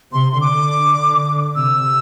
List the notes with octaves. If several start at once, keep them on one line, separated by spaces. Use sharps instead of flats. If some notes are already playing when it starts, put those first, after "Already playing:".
C3 C6
C6
D3 D6
C3 E6